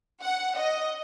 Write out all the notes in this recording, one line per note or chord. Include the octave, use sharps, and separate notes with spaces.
F#5
D#5